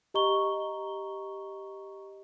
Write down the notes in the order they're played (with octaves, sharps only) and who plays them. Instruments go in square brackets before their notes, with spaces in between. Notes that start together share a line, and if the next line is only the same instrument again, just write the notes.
[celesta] G4 D#5 A#5 C#6 G7